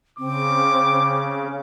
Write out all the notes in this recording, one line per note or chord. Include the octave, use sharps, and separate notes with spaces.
C#3 C4 D6